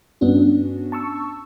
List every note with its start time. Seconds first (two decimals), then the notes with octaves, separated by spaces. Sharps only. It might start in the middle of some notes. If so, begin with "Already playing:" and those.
0.21 G2 B3 C#4 D4 F#4
0.92 A5 C#6 E6